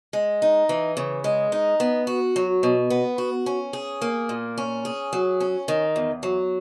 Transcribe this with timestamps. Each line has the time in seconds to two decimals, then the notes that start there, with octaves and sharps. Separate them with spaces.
0.13 G#3
0.42 D#4
0.69 E3
0.97 C#3
1.24 G#3
1.52 D#4
1.80 B3
2.07 F#4
2.36 F#3
2.63 B2
2.90 B3
3.18 F#4
3.46 C#4
3.73 G#4
4.02 A#3
4.29 A#2
4.58 C#4
4.85 G#4
5.13 F#3
5.40 C#4
5.68 D#3
5.96 E2
6.23 F#3